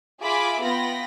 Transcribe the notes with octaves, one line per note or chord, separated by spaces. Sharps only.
F4 G#4 E5 G#5 B5 D6
B3 F4 G5 B5 A#6